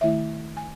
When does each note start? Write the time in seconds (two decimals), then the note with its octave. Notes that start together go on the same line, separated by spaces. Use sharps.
0.01 D#3 A3 E4 E5
0.57 G#5